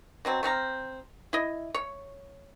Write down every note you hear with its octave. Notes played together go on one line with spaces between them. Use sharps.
B2 F#3 C4
A3 C4 F5 A#5
E4 D#5
C#5